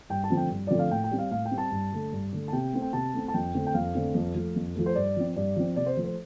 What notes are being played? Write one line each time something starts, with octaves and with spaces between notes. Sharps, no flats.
G2 G5
A5
D3 F3 A3 C4
G5
G2
D3 F3 A3 C4 D5
F5
A2 G5
G5
G3 C4
F5
A2 F5
G5
G3 C4
A5
G2
D3 A3
G2
D3 A3
A5
C3 G5
A3 C4
G5
C3 A5
A3 C4
A5
F2 G5
D3 A3 C4
G5
F2 F5
D3 A3 C4
F2
F3 A3
F2
F3 A3
C5
G2 D5
F3 C4
G2 D5
F3 C4
C3 D5
C5
F3 A3
C5